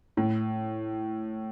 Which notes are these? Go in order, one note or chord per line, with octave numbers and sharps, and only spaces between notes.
A2